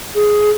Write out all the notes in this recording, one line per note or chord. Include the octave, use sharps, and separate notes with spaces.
G#4